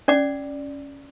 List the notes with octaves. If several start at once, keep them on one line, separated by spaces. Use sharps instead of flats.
C#4 D5 F#5 D6